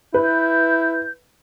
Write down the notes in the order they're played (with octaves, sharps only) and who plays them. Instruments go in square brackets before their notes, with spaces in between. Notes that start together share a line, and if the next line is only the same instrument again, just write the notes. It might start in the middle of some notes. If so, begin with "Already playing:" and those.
[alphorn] E4 [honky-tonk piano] B4 [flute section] G6